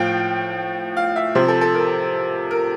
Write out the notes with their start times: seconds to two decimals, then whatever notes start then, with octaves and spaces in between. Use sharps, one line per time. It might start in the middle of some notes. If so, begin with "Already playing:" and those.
Already playing: A2 F3 F5 G5
0.97 F5
1.16 E5
1.35 C3 F3 C5
1.48 A4
1.61 A4
1.74 A#4
2.51 A#4